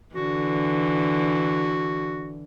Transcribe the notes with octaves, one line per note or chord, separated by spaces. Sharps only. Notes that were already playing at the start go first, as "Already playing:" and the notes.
D3 E3 F#4